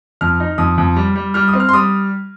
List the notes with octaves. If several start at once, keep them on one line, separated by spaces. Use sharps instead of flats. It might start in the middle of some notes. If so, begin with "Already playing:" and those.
F2 F6
D#4
F2 D#6
F2
G3
G3
G3 F6
D#6
C4
F6
C6
G3 D#6